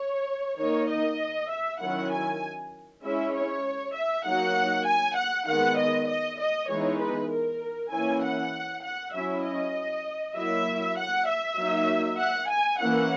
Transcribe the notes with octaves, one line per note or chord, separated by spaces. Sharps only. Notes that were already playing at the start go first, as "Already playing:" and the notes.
Already playing: C#5
D#3 A#3 D#4 C#5
D#5
E5
D#3 F#3 C#4 E4 F#5
G#5
G#3 C#4 E4 E5
C#5
E5
F#3 A#3 D#4 F#5
G#5
F#5
D#3 G#3 B3 F#5
D#5
D#5
D#5
E3 G#3 B3 D#4 C#5
B4
A#4
E3 A#3 C#4 E4 G#5
F#5
F#5
F#3 C#4 E4 E5
D#5
F#3 A#3 E4 E5
F#5
E5
F#3 A#3 D#4
F#5
G#5
E3 A#3 C#4 E4 F#5